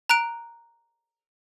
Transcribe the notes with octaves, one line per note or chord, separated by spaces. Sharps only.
A#5 F#6 D7